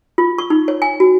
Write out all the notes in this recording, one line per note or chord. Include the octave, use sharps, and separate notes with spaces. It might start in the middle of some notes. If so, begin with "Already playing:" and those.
F4
C#6
D#4
C#5
G#5
F#4